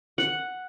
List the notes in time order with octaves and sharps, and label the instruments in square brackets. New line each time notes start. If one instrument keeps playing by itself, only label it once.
[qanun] F#5